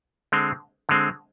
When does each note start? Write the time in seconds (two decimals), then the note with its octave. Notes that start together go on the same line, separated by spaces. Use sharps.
0.32 D3 G#3 C4
0.89 D3 G#3 C4